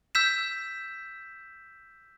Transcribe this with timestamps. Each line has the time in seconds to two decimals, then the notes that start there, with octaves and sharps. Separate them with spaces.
0.15 E6 G6 B6 E7